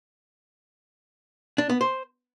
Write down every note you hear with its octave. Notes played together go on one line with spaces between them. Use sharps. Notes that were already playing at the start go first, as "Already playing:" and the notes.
D4
B3
C5